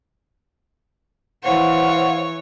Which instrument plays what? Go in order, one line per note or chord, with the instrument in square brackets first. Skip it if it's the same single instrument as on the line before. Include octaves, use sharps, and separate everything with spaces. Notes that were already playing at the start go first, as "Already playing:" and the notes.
[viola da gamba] E3 C#5 [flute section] C5 F5 F#5